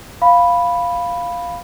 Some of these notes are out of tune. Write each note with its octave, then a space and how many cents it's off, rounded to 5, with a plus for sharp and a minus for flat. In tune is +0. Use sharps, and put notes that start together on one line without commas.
F5 +0 B5 +0